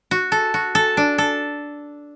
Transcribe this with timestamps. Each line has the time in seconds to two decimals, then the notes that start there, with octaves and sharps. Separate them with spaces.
0.11 F#4
0.32 A4
0.54 F#4
0.75 A4
0.97 D4
1.18 A4